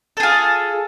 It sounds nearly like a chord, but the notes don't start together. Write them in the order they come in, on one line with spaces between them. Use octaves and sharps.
A4 G#4 F4